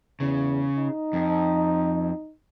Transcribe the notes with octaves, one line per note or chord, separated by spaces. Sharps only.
E2 C#3
D#4
F2